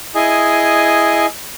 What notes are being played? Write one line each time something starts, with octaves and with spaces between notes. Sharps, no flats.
E4 G#4 D#5 G#5